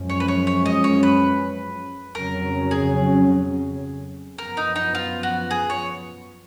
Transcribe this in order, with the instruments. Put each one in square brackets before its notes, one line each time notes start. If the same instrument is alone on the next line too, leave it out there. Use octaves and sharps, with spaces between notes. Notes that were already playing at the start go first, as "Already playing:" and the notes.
Already playing: [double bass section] F#2 F3 G#3 C#4
[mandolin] C#5
B4
C#5
C#5
D#5
C#5
B4
[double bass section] F2 C#3 F#3 C#4 [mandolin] A#4
[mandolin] G#4
[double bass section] F#2 F3 B3 [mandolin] A#4
[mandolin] D#4
D#4
F4
F#4
G#4
C#5